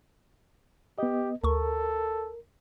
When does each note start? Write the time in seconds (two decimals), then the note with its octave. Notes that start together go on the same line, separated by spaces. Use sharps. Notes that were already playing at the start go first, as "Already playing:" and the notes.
0.98 B3 G4 D#5
1.44 D2 A4 A#4 C#6